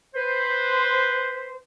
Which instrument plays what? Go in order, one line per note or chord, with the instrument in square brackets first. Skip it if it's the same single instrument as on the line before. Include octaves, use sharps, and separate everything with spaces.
[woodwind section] B4 C5